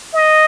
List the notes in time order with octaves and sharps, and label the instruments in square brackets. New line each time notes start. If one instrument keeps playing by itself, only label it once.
[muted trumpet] D#5